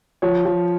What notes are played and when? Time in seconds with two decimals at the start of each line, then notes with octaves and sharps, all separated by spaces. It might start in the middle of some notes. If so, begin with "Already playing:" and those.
0.22 F3 C#5
0.45 F3